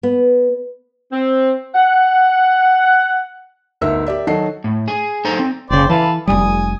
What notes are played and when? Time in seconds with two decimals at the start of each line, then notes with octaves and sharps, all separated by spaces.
0.03 B3
1.12 C4
1.75 F#5
3.81 G1 D2 D#4 A#4 E5 E6
4.06 G4 A#4 D5 E5
4.27 D#3 F#3 F#4 A4 D#5 C7
4.64 A2
4.88 G#4
5.25 D#4 A4 C5 A#5
5.39 C4
5.70 F#1 C#3 C5 D5 G5
5.90 E3 A4 B4 F5
6.27 F1 B1 G3 G#5 D#6